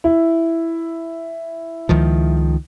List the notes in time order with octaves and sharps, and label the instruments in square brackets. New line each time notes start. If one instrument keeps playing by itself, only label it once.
[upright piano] E4
[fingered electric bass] C#2 D#3 F3